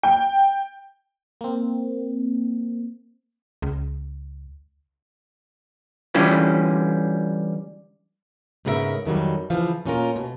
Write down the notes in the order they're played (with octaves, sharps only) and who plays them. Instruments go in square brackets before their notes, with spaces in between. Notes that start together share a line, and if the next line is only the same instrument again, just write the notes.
[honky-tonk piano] G5
[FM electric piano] A#3 C4
[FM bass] C#2
[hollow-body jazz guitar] D3 E3 G3 C#4 F4
[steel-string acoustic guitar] G#2 C#3 B3 F4 A#4 E5
F2 D#3 F#3 G3
C#3 E3 F3 F5
A#2 C#4 F4 A#4
B2